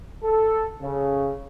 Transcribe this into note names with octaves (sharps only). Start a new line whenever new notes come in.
A4
C#3